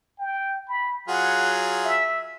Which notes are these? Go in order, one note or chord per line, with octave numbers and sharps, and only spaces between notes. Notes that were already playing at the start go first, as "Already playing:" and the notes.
G5
B5
F#3 F4 G#4 F#5
E5